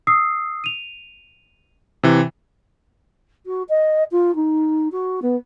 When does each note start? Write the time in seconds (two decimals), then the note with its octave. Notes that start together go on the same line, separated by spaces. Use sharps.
0.07 D#6 E6 C7
0.64 D#7 F7
2.03 C3 E3
3.46 F#4
3.69 D#5
4.11 F4
4.35 D#4
4.92 F#4
5.22 B3